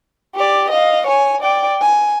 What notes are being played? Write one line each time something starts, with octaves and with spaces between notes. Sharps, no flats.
G4 D5
D#5 F5
C#5 G#5
D5 G5
G#5